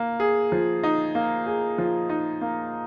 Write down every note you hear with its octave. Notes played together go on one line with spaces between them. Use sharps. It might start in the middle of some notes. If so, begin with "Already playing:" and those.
Already playing: A#3
G#4
F3
D#4
A#3
G#4
F3
D#4
A#3